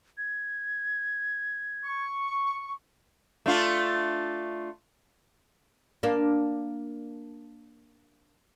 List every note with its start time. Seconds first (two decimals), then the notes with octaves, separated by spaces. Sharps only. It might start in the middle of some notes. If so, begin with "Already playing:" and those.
0.18 G#6
1.85 C#6
3.46 A3 D4 F4
6.03 A#3 D4